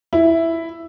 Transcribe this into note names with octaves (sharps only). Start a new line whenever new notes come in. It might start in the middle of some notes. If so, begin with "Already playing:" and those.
E4